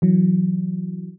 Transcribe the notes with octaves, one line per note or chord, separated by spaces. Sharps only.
E3 F#3